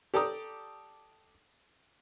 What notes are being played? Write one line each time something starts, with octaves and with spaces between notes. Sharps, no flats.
G4 A4 D5 A#5 D#6